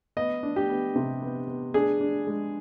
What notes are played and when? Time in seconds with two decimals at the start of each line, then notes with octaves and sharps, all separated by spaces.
0.17 B3 D#5
0.43 D4
0.56 G4
0.69 B3
0.96 C3
1.22 B3
1.48 B3
1.74 D4 G#4
2.01 D4
2.27 G#3